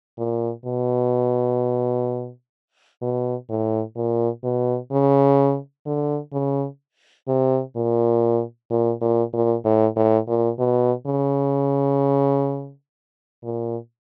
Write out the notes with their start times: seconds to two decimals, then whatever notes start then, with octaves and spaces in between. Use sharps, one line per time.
0.18 A#2
0.65 B2
3.02 B2
3.49 A2
3.96 A#2
4.44 B2
4.91 C#3
5.86 D3
6.33 C#3
7.28 C3
7.76 A#2
8.71 A#2
9.01 A#2
9.33 A#2
9.65 A2
9.96 A2
10.27 A#2
10.59 B2
11.07 C#3
13.43 A#2